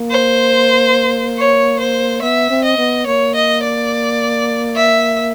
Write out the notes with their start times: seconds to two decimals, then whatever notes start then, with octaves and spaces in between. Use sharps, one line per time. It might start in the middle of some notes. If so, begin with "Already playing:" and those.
Already playing: A#3
0.10 C5
1.38 C#5
1.80 C5
2.22 B3 E5
2.50 C4
2.64 D#5
2.78 B3
3.07 A#3 C#5
3.35 D#5
3.63 D5
4.76 E5